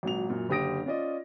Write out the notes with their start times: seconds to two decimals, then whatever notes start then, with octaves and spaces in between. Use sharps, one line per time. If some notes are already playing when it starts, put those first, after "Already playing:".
0.03 G#1 A#2 F#3 F7
0.30 F#2 A#2
0.49 F#1 D3 G4 D#6 A#6 D7
0.86 C#4 F4 D5 D#5